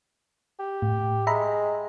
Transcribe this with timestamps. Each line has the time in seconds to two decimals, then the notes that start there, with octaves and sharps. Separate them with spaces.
0.59 G4
0.82 A2
1.27 G#3 E5 A#5 B5